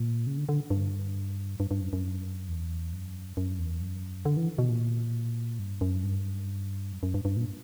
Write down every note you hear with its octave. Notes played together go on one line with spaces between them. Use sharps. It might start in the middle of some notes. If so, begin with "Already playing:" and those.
Already playing: A#2
C#3
D3
D3
G2
G2
G2
F#2
F#2
E2
F#2
F#2
E2
F#2
D3
E3
B2
A#2
G2
F#2
G2
F#2
F#2
G2
G2
A#2